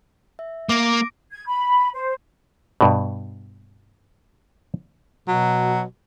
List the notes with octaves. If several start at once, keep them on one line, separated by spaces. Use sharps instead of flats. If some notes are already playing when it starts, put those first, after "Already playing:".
E5
A#3 D6 A#6 D7
G#6
B5
C5
G2 B2
B2 F#3